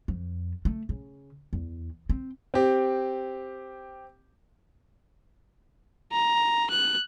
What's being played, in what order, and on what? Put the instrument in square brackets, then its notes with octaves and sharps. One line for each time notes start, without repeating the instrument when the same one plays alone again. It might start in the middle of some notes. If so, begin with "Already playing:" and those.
[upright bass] F2
A3
C#3
E2
C4
[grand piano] C4 G4
[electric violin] A#5
F#6